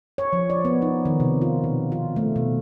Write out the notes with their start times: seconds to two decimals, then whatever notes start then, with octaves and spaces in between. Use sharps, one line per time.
0.18 C#5
0.33 F3
0.50 D5
0.65 B3
0.82 D#4
1.05 D#3
1.20 C3
1.42 F4
1.64 B2
1.92 F4
2.16 A3
2.36 B2